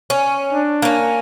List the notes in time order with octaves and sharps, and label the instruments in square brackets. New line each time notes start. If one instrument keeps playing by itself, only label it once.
[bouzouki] C#4
[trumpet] D4
[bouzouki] A#3 C#4